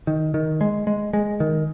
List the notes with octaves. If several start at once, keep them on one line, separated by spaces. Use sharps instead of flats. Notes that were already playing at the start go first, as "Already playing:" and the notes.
D#3
D#3
G#3
G#3
G#3
D#3